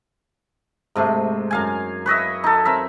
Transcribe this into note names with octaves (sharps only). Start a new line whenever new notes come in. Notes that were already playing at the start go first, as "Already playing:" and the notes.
G#2 C3 A3
F#2 F5 G#5
B4 C#5 D#5 E5
D#4 A4
C4 A#4 E5